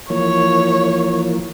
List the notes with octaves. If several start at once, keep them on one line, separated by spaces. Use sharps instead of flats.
E3 F3 A#3 C#5